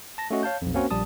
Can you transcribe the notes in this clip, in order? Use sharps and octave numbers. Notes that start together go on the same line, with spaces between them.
A5 A#6
A3 C#4 F#4 D#5
C#5 F5 A5 G6
B1 F2
A#3 C4 C#4 F#4 A#4 C5
A#1 G3 A5 D#6